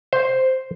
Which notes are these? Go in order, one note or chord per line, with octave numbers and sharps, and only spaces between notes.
C5